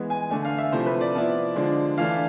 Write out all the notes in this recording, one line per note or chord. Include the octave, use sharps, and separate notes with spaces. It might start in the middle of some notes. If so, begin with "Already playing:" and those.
Already playing: E3 G#3 B3
G#5
D3 A3 D4 G#5
F5
E5
C3 F3 A3 E4 C5
B4
D5
F3 B3 E4
D3 F3 G#3 D4
E3 A3 D4 F5